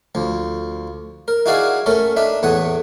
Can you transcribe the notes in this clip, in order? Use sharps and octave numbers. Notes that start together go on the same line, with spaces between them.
D2 F3
A#4
D#4 E4 F#4 G#4 D5 F5
A3 C#4 A4 A#4
D4 D#4 E5
E2 A2 A3 F#5 D#6